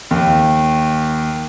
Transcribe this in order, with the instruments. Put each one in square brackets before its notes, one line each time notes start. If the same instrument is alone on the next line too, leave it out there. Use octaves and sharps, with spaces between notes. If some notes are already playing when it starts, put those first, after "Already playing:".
[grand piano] D#2